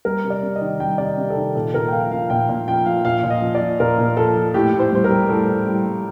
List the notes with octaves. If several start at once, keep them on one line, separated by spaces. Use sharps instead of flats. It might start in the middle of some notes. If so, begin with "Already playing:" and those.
G3 A#4
C3
D5
C3
D#5
D#3
G3 G5
C3 D5
D#5
C3
A4
D#3
A#2 A4
A#2 A#4
G5
F3 F5
F3 F5
A#2 G5
A#2
F3 G5
F3 F5
A#2 F5
A#2
D#5
F3
D5
F3
A#2 A#4
A#2
F3 A4
F3
A2 G4
A2
C5
G3 C5
A#4
G3
A2 A4
A2
G3
G3